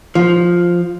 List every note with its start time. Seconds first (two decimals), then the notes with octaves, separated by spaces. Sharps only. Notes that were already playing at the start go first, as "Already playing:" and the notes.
0.15 F3